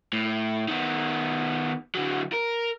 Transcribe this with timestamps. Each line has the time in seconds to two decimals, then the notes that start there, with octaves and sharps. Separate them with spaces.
0.13 A2
0.68 D#3 B3
1.95 D3 F#3
2.34 A#4